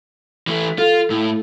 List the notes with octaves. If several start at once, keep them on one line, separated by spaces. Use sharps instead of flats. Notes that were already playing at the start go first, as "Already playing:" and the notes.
E3 A3
F4 A4
A2 A3 E4